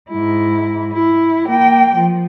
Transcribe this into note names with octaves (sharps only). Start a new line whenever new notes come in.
G#2 E4
E4
A#3 G5
F3